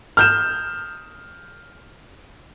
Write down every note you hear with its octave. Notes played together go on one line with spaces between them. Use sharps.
F6 G6 E7